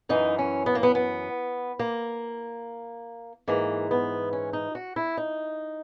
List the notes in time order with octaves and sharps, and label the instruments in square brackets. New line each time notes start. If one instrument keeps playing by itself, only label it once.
[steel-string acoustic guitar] F#2 E3 D#4
C#4
B3
A#3
B3
B3
A#3
G#2 E3 A#3
B3
C#4
D#4
F#4
E4
D#4